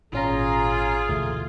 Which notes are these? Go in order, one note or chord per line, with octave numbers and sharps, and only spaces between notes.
G#1 A#2 C#4 F4 G#4 A#5
D2 B2 E3 A3